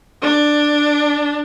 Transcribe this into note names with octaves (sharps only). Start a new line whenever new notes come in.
D4